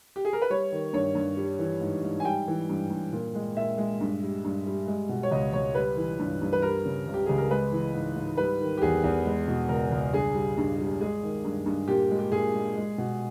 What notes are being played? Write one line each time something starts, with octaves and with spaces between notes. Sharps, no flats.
G4
G#4
A#4
B4
G3 C#5
D#3
G2 C#5
G2
G3
E3
G#2
G#2
G#5
G3 G5
E3
G2
G2
A#2
G#3
A#2 E5
G#3
G2
G3
G2
G3
G#3
B2
C#5
C#2 D#5
C#2 C#5
G3 B4
E3
G2
G2
B4
G3 A#4
C#3
C#2
G4
C#2 G#4
A#4
G#3 B4
E3
G#2
G#2
G3 B4
D#3
G4
E2 G#4
E2
G#3
B2
C#2 A#4
C#2
G2 G#4
G3
G2
G3
G#3 G#4
D#3
G2
G2
A#2 G4
G#3
G4
A#2 G#4
G#3
G#3
B2